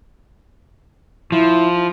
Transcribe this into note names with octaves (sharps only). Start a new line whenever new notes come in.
F3 E4